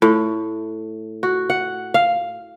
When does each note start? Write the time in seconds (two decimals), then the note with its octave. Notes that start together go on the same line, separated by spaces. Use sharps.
0.02 A2
1.23 F#4
1.50 F#5
1.94 F5